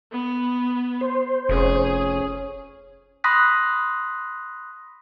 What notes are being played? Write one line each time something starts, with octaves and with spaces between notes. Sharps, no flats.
B3
C5
F1 C#4 G#4
B5 C6 D#6 F#6 A#6 B6